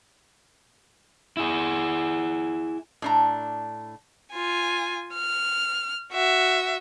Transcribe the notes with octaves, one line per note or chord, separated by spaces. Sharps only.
E4 G#4
A2 D4 A#5
F4 G#5
F6
F#4 E5